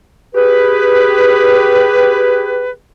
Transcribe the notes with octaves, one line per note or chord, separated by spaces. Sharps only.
G4 G#4 B4